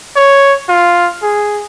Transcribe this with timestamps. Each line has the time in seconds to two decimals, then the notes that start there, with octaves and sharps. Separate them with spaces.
0.16 C#5
0.69 F4
1.23 G#4